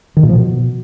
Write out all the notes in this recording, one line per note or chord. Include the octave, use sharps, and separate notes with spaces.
D#3
A#2
F3
B2